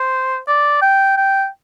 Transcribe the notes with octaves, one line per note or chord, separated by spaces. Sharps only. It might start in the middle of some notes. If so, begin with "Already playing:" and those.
Already playing: C5
D5
G5
G5